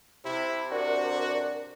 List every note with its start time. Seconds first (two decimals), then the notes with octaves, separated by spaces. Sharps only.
0.25 C3 E4
0.71 D4 F#4 A#4 D5